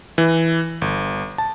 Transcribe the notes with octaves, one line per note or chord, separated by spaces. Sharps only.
E3
G1
A5